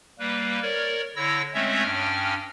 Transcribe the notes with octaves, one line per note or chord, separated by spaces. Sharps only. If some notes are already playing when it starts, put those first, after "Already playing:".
G3 A#3 B4
A#4 C#5 D5
D3 E4 C#5 E6 A#6
G#3 A3 C4 C#4 C#5 E5
G2 C#4 G5 F6